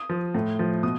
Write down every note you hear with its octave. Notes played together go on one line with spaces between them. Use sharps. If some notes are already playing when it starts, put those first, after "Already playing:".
Already playing: D#6
F3
A2
F3
B2 D#6